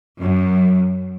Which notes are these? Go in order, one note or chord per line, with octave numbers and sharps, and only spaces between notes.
F#2